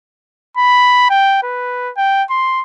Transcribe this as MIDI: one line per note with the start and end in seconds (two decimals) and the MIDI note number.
0.57 1.05 83
1.10 1.41 79
1.43 1.91 71
1.97 2.24 79
2.30 2.63 84